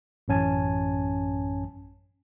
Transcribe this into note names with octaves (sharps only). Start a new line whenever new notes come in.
A1 F#2 C#4 G#5 A5